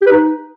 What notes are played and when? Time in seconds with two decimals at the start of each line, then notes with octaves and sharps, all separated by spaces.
0.02 G4
0.07 B4
0.12 D#4